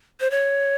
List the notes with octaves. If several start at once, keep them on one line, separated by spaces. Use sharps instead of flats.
C5
C#5